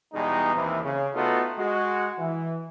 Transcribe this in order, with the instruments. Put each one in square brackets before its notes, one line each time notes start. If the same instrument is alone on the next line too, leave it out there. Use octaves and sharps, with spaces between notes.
[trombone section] E2 B2 G3 G#3 D#4
D#2 C3 E3
C#3
A3 B3 D#4 F4 F#4 A4
G#3 F#4
E3